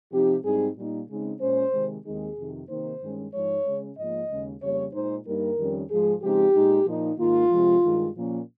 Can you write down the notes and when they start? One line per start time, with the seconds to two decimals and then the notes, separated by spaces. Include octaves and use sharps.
0.12 C3 F3 C4 D#4 G4
0.43 G#2 G3 C4 D#4 G#4
0.76 A#2 G3 A#3 D#4
1.09 C#3 G#3 C4 D#4
1.40 A#2 G#3 C#4 C5
1.72 C3 D#3 G#3
2.04 D#2 D#3 G#3 C4 D#4 G#4
2.37 F2 C3 D#3
2.68 C3 D#3 A#3 D#4 C5
3.01 G2 D#3 G#3 C#4
3.33 G#2 F3 G#3 D#4 C#5
3.65 C#3 G#3 C#4
3.97 G#2 F3 A#3 D#5
4.30 D#2 C#3 G#3
4.61 F2 C#3 G3 A#3 C#5
4.93 A#2 G#3 D#4 C5
5.25 G2 G3 A#3 D#4 A#4
5.58 F2 D#3 G3 C#4
5.90 G#2 F3 G#3 G#4
6.21 C#3 F3 G#3 C4 D#4 G4
6.54 A#2 G#3 D#4
6.86 A#2 F3 A#3 D#4
7.18 G#2 D#3 A#3 D#4 F4
7.51 C3 F3 G#3
7.83 G2 D#3 G#3
8.15 A#2 F3 A#3 C#4